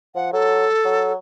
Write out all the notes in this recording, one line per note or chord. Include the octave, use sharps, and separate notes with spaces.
F3 F#5
F#3 A4
F#3